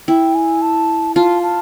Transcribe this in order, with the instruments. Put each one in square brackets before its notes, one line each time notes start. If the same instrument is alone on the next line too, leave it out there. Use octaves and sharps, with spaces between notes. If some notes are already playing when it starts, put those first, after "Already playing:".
[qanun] E4 [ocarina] G5
[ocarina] G#5
A5
[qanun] F4 [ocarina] A5
[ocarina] A5